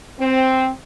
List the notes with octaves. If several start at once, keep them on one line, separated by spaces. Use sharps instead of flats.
C4